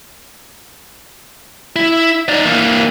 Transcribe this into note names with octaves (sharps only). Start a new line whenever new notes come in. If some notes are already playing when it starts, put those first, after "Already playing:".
E4
D#4 D5
E3 A#3